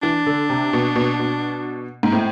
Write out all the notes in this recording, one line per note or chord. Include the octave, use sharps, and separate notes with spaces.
E3 D4
D3
C3
B2
B2
B2
G#2
A2 C4